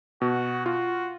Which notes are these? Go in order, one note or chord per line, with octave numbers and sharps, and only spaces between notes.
B2 F#4
F4 F#4